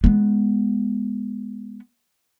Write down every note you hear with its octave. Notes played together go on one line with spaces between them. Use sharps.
G#3 B3